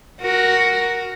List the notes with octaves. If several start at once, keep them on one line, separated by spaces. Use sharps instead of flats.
F#4 A#4